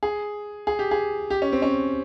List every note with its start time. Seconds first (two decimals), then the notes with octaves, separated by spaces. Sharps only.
0.03 G#4
0.67 G#4
0.79 G4
0.91 G#4
1.30 G4
1.42 C#4
1.52 C4
1.62 C#4